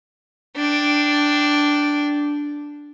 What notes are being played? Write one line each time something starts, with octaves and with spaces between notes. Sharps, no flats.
D4 G5